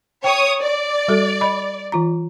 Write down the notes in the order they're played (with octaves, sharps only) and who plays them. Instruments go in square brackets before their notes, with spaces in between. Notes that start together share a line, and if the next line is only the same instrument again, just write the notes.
[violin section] C#5 D#6 [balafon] G5
[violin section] D5
[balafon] G3 F#4 A4
D#5 B5
E3 F4 A#5